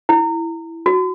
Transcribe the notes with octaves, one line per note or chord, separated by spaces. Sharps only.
E4
F#4